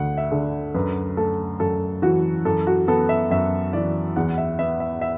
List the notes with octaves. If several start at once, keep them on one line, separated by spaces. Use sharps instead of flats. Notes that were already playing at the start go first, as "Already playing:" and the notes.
Already playing: D2 F#5
E5
D3
F#2 B4
A3 A4
F#2 A4
E3 F#4
F#2 A4
F#4
B3 A4
E5
F#2 E5
E3 D5
E2 F#5
E5
B3 E5
E5
E5